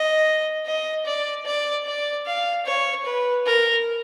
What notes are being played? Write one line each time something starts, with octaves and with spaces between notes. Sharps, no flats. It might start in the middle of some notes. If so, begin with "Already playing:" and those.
Already playing: D#5
D#5
D5
D5
D5
F5
C#5
B4
A#4